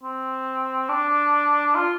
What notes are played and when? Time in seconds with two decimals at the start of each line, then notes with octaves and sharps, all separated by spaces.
0.03 C4
0.89 D4
1.75 F4